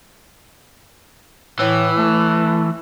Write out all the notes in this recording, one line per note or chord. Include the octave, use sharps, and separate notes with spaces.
A2 E3
A3